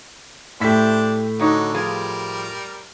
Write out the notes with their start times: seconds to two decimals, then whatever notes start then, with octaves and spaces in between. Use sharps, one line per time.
0.60 A2 D4 E4 G4 C5 B6
1.39 D3 F#3 D#4 C#5
1.74 F3 G3 F4 G#4 A#4